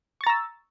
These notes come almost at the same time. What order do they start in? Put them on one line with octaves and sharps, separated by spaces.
C#6 A6 A#5 E6